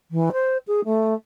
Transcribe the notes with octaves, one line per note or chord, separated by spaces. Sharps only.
E3
C5
G#4
A3